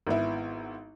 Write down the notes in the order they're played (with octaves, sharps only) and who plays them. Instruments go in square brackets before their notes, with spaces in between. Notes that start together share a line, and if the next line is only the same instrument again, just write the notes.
[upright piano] G#1 B3 E4